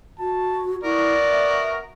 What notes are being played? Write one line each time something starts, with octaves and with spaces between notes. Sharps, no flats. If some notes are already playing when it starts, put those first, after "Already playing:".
F#4 A5
B3 E4 F#4 A#4 D5
E5